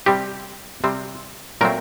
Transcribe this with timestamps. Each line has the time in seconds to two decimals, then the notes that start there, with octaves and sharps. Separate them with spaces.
0.06 C3 G3 C4 G4
0.84 C3 G3 C4
1.61 A#2 F#3 A3 C4 A#4